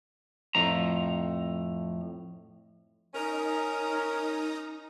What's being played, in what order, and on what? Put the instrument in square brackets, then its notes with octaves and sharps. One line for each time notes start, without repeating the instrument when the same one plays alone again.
[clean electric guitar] F2 A2 A#5
[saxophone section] C#4 A#4 [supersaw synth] D#4 A#5 D#6